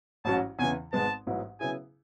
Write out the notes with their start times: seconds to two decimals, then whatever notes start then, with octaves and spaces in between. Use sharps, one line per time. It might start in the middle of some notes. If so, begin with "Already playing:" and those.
0.25 A1 G#2 F#3 C#4 F#4 A5
0.59 E2 C#3 E3 G#5
0.92 G#1 G#2 G#3 B3 A5
1.27 A1 G#2 F#3 B3 E4
1.60 C#3 F#3 B3 E4 G#4 G#5